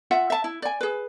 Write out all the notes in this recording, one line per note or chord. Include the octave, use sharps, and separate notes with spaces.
F4 E5 F#5
E5 A5
E4
D5 G#5
G#4 B4